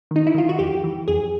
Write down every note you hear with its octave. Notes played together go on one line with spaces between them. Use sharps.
D#3 D#4
E4
D#3 F4
F#4
F2 G4
E3
F2 G#4